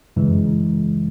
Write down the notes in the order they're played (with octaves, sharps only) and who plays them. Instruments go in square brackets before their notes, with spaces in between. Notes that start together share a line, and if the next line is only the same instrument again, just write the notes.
[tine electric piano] F#2 C#3 E3 G#3